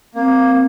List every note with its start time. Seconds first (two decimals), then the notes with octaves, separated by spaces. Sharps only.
0.15 A#3 C4